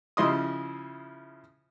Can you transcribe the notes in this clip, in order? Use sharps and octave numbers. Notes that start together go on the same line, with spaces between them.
C#3 F3 E4 D#5 C6 D#6